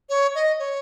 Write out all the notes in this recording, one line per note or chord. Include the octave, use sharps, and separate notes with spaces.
C#5
D#5
C#5